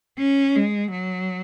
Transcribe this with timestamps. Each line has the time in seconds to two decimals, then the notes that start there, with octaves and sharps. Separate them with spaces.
0.18 C#4
0.56 G#3
0.91 F#3